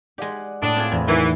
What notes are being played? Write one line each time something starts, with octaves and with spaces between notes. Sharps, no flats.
G#3 G4 D5 F#5
A2 D4 D#6
C4 F4 G#4
E2 C3
D#3 E3 F#3